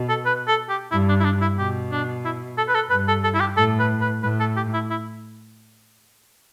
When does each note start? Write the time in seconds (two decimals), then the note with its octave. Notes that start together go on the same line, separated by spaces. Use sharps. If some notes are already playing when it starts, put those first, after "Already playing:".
Already playing: B2
0.09 A4
0.26 B4
0.48 A4
0.70 G4
0.91 G2 E4
1.09 D4
1.20 E4
1.24 D4
1.42 E4
1.58 B2 G4
1.92 D4
2.25 E4
2.58 A4
2.69 B4
2.75 A4
2.90 G2 B4
3.08 A4
3.24 A4
3.34 E4
3.40 G4
3.57 A2 A4
3.79 B4
4.01 B4
4.23 A2 B4
4.40 A4
4.57 G4
4.74 E4
4.90 E4